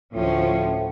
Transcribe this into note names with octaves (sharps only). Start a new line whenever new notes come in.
D2 A2 F3 C#4